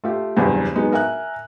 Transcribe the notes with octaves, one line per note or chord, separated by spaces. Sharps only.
A3 F4 G4
F#1 E2 G2
F#3 G#3 B3 D#4
A#4 E5 G#5 F#6